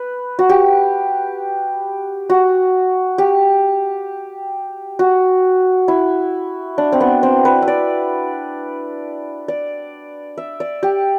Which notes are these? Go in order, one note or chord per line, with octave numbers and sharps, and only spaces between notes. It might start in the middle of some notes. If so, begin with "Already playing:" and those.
Already playing: B4
F#4
G4
F#4
G4
F#4
E4
D4
C4
B3
C4
B4
E5
D5
D5
E5
D5
G4